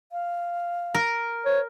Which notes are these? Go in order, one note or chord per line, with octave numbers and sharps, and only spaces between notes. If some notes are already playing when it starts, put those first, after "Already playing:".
F5
A#4
C5 C#5